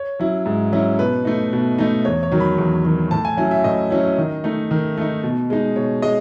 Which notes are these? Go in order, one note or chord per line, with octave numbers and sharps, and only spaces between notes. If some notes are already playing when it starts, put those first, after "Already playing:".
Already playing: C#5
F#3 C#4 E4
G#2
F#3 C#4 E4
B2 B4
A3 D#4
B2
A3 D#4
E2 C#5
C#5
D#3 F#3
B5
E2
D#3 F#3
A2 A5
G#5
F#3 C#4 E4 G#5
E5
A2 D#5
F#3 C#4 E4
D#3
A3 D#4
D#3
A3 D#4
B2
G#3 D#4
B2 C#5
G#3 D#5